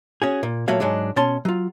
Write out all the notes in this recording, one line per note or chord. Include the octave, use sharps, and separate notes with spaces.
C#4 F#4 G#4
A#2
A#2 F#3 A3 F#4 C#5 F5
G#2 F#3 G#3 D4
B2 C#4 A5 C6
F#3 F4